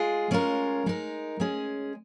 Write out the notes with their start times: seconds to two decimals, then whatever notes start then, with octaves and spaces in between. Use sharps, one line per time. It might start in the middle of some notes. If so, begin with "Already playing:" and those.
Already playing: G#3 F4 G#4
0.31 G#3 C#4 F4 A#4
0.86 G#3 D#4 A#4
1.40 G#3 C#4 G#4